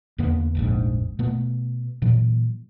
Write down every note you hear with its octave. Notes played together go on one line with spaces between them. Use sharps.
E2 D3 A#3 B3
F1 A#1 G#2
B2 A3 B3
A#2 E3 F#3